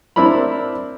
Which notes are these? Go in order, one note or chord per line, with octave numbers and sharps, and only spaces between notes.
C4 D4 E4 A#4 B5